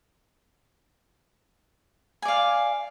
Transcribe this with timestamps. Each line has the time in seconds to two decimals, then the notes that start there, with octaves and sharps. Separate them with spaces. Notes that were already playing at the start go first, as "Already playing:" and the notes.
2.22 G#5
2.25 D5
2.28 F5